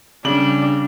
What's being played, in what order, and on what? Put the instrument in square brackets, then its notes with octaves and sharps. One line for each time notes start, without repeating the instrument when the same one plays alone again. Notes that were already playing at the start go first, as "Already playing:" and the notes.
[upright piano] C#3 F#7 [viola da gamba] G3 D4